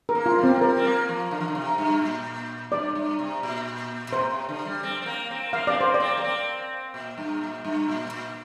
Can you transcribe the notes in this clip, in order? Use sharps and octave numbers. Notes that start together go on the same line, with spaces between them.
A#4
A#3
F4
G3
C4
A#3
G3 A#4
C4
A#3
F3
D3
F3
D3
C3
G2
A#2
G2 D5
G2
C3
A#2
A#2
C3 C5
C3
D3
G3
C4
C4
A#3
C4
A#3 F5
C4 D5
A#3 C5
D5
C4
A#3
C4
A#2
G2
A#2
G2
A#2
A#2